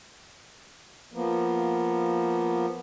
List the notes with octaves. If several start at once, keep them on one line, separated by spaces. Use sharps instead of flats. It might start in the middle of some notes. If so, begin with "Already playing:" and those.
F3 A#3 B3